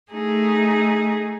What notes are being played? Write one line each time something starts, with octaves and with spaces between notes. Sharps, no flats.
A3 D#4 G#4